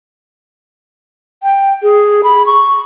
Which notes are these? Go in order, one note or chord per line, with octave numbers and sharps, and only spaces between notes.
G5
G#4
B5
C#6